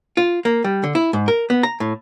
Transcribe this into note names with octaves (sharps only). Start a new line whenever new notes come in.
F4
A#3
G3
D3
E4
G#2
A#4
B3
A#5
A2